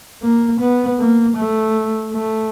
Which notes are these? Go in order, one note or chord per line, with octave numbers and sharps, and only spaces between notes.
A#3
B3
A#3
A3
A3